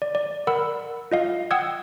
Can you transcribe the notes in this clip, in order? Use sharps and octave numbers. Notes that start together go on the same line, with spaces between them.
D5
D5
A#4 F#5 B5 E6
F4 D#5 F5
F#5 G5 D#6 E6 G#6